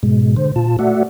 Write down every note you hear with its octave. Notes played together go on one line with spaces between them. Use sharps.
G#2 B2 G#3
D3 C5
A#2 F4 A5
A3 F#4 D5 E5 F#5